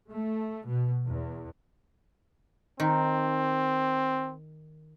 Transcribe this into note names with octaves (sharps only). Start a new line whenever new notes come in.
A3
B2
E2
D#3 C4